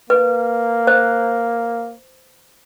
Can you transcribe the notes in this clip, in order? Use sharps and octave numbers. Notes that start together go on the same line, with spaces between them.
A#3 B4
C5